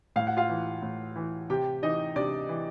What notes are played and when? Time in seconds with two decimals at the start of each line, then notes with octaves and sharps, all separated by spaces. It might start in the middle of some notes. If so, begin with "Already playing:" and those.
0.16 A2 F5
0.27 F#5
0.37 F4 F5
0.49 E3
0.83 A2
1.16 E3
1.50 C3 G4 G5
1.82 E3 D#4 D#5
2.16 C3 D4 D5
2.49 E3